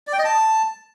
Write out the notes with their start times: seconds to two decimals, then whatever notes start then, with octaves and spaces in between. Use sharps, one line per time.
0.07 D5
0.13 G5
0.19 D#5
0.24 A5